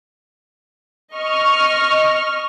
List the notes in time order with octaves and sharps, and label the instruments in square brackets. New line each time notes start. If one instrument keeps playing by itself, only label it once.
[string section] D#5 C#6 F6